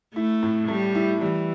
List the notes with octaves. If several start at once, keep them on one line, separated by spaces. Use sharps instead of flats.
A3 E4
A2
G3 A3
E4
E3 G3